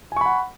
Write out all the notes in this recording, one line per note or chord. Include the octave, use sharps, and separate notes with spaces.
F#5 G#5 B5 C#6